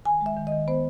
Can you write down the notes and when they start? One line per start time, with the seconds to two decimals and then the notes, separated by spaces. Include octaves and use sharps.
0.05 D#3 G#5
0.21 G#3
0.26 E5
0.37 D#3
0.47 D#5
0.52 D#3
0.68 B3 C5